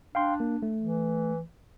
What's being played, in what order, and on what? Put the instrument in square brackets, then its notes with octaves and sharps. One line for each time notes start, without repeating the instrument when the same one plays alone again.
[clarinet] D4 [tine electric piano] F5 G5 C6
[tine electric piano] A#3
A3
[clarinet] E3